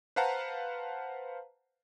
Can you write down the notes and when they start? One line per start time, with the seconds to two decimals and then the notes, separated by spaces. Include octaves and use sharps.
0.16 B4 C5 F5 F#5 A5 A#5